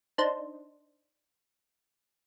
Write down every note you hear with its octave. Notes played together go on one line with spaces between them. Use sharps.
D4 D#4 C5